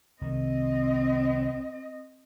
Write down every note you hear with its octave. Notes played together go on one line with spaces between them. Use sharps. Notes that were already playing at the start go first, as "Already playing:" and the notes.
C2 D#3 C4 D#5